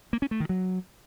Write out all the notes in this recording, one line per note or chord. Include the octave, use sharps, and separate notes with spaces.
A#3
C#4
A3
D#3
F#3